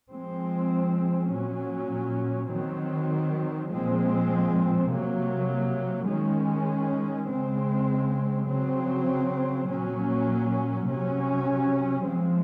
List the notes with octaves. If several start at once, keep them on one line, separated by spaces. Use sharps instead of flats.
F3 G#3 C4
A#2 F#3 C#4
D#3 F#3 C4
A#2 F3 G#3 C4
C3 F#3 A#3
D#3 G#3 C#4
C#3 G#3 C4
C#3 F#3 C4
A#2 F#3 A#3 C#4
C3 F#3 C#4
F3 G#3 C4